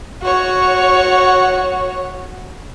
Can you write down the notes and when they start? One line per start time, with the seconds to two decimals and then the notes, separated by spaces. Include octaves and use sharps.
0.22 F#4 C#5